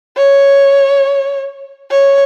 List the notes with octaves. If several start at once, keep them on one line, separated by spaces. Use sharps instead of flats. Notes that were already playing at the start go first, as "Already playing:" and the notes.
C#5
C#5